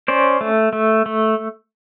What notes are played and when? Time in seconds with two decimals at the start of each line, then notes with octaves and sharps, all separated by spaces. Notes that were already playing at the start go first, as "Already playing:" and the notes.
0.08 C#4 C5 D5
0.41 A3
0.73 A3
1.06 A3